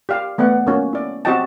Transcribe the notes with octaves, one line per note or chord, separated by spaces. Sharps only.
G4 D5 F5 G5
A3 B3 D5 F#5
A#3 C#4 F#4
E4 D5
C4 F#4 G4 D#5 G5 A5